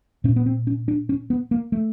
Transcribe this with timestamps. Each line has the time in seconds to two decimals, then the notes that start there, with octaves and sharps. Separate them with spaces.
0.24 A#2 C#4
0.36 B3
0.46 C4
0.67 C#4
0.88 D4
1.09 C#4
1.30 B3
1.51 A#3
1.72 A3